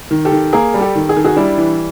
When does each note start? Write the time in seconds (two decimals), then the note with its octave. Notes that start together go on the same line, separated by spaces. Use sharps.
0.11 D#3
0.25 G4 A4
0.32 D#3
0.53 A#3 G#4 A#4
0.74 G3
0.81 G4 A4
0.95 D#3
1.09 G#4
1.16 D#3 A4
1.25 F#4 G#4
1.36 G3 D4 E4
1.58 E3